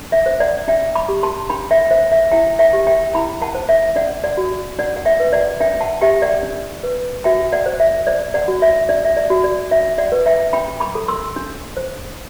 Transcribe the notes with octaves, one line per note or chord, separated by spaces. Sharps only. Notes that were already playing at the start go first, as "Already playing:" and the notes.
Already playing: D4
E5
C5
D5 F#5
D4 E5 G5
B5 D6
G4
A5 C6
D4 G5 B5
E5 G5
C5 E5
E5
E4 E5 G5
E5 G5
G4
E5 G5
E4 G5 B5
F#5 A5
C5
E5
D4 D5 F#5
D5 F#5
F#4
D4 D5 F#5
F#5
E5 G5
B4
D5 F#5
D4 E5 G5
F#5 A5
G4 E5 G5
D5 F#5
D4
B4
F#4 E5 G5
D5 F#5
C5
E5
C5 D5
D5 F#5
F#4
E5
D4 D5
E5
D5
F#4
D5
D4 E5
D5 F#5
B4
E5 G5
D4 G5 B5
B5 D6
A4
C6 E6
D4
C5